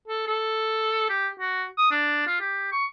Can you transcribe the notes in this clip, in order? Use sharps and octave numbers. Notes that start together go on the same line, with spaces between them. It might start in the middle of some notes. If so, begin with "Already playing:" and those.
A4
A4
G4
F#4
D#6
D4
F4
G4
C#6